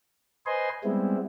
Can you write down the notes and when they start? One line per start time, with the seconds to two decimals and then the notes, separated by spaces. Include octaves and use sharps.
0.46 B4 C5 D#5 G#5 C6
0.84 G3 G#3 B3 C4 E4